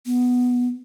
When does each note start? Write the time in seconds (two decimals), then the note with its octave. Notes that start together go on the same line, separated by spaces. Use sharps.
0.06 B3